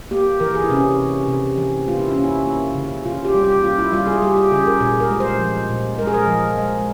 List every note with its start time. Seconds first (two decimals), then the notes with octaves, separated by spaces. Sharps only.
0.11 A#3 G4
0.40 E3 A#4
0.55 G#4
0.64 E4
0.70 C3 C#4
1.00 C3
1.28 C3
1.58 E3
1.88 A#3 F4
1.99 E4
2.11 A#3 C#4
2.24 E4
2.46 A#3
2.75 C#3
3.05 C#3 F4
3.25 G4
3.35 G3
3.44 G4
3.63 A#3 F4
3.79 E4
3.92 G3 F4
4.07 G#4
4.22 G3 G4
4.37 G4
4.52 C#3 G#4
4.67 A#4
4.80 A#2 G#4
5.00 A#4
5.11 G#3
5.20 C5
5.39 F3
5.70 A#2
5.98 G#3 A#4
6.07 G#4
6.14 A#4
6.27 F3
6.58 G#3